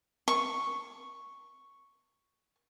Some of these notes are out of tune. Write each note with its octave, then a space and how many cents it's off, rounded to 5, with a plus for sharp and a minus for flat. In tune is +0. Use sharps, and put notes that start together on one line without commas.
C#6 +0